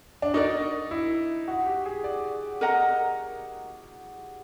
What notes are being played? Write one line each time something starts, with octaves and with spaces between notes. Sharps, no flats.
D4
D#4 F#4 A#4 D5
E4
F#4
G4
G#4
D5
A#4 D#5 F#5 A#5